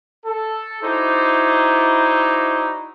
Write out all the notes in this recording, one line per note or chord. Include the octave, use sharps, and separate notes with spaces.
A4
D#4 E4 F#4 C5 D5